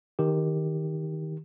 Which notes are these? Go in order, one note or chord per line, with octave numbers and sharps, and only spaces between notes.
D#3 G4